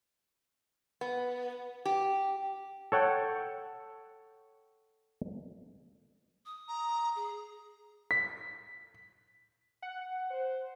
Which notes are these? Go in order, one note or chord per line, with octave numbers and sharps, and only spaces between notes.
B3
G4
A4 C#5 F#5 G5
D#6
A#5
G#4
B6
F#5
C5